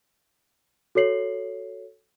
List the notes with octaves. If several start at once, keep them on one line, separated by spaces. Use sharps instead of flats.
F#4 A4 C#5 C7 F#7